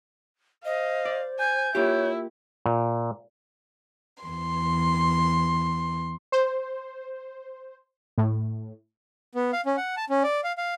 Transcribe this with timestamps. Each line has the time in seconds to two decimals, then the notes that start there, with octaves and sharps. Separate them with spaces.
0.65 C5 D#5 F5
1.05 D5
1.39 G#5 G6
1.75 A#3 E4 F4 G4 C#5
2.66 A#2
4.23 E2 C6
6.32 C5
8.18 A2
9.35 B3
9.53 F5
9.66 C#4
9.77 F#5
9.97 A5
10.10 C#4
10.23 D5
10.44 F5
10.58 F5